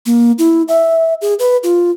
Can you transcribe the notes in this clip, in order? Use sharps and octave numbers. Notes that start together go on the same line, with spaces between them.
A#3
E4
E5
G#4
B4
F4